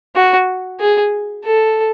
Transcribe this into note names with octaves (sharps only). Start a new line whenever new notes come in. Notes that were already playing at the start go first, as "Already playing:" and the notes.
F#4
G#4
A4